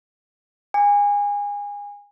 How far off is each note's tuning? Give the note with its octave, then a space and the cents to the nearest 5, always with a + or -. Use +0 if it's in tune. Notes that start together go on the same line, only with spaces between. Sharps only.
G#5 -25 D6 +0